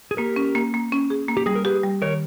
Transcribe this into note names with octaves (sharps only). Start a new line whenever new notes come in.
G#4
A#3 G4 A#4
C#4
A#3
A#3
C#4
G#4
A#3
G4
G3 G#4
A#4
G4 G#4 B4
G3
D#3 A#4 C#5